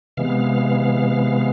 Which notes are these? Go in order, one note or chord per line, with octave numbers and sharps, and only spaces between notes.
C3 E3 G#3 B3 F5